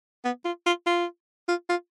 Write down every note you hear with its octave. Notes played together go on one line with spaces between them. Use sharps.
B3
F4
F4
F4
F4
F4